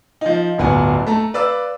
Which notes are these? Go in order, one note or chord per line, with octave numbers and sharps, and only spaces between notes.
F3 D#4
D1 G1 B3 D4 F#5 G#5
A3 A5 A#5
B4 D5 F5 E6